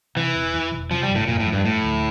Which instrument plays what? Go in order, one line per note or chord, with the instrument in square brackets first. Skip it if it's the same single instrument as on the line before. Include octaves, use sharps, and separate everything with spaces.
[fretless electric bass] C3 [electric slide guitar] E3
[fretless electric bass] E1
E2
E1
[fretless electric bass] C3 [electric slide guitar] F3
[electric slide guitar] G3
[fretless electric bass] G1
[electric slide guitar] A2
[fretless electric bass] F2 [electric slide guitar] A#2
[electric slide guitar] A2
[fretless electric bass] F3
[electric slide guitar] G2
[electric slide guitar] A2 [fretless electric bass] A3
[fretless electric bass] D2